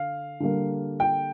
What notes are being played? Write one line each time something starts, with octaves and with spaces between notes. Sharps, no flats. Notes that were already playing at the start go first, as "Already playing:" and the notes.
Already playing: D3 F5
D3 G3 A#3
G5